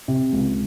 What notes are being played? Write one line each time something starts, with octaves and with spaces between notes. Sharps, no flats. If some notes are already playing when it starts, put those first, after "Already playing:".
C3
C#2